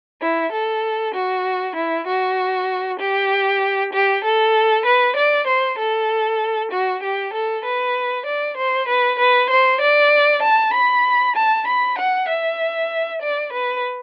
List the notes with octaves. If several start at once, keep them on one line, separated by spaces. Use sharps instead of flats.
E4
A4
F#4
E4
F#4
G4
G4
A4
B4
D5
C5
A4
F#4
G4
A4
B4
D5
C5
B4
B4
C5
D5
A5
B5
A5
B5
F#5
E5
D5
B4